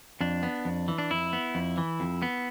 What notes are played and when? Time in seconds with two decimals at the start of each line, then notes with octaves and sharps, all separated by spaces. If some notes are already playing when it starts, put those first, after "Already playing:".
0.21 F2 D4
0.43 B3
0.65 F2
0.88 E3
0.98 D4
1.10 F2 E4
1.33 B3
1.55 F2
1.78 E3
2.00 F2
2.22 B3